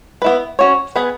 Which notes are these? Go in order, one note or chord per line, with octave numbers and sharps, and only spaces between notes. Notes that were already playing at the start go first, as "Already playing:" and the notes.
B3 E4 B4
C#4 F#4 C#5
B3 G#4 B4